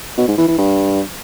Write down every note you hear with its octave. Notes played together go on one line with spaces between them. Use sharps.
B2
G#2
E3
E3
G2